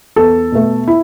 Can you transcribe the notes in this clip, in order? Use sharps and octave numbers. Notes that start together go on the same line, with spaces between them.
E2 A4
B2 A3
E4